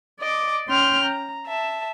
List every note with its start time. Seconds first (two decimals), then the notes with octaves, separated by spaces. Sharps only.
0.21 D5 D#5 D6
0.68 C#4 G5 C6 F6 G6
1.05 A#5
1.47 E5 A5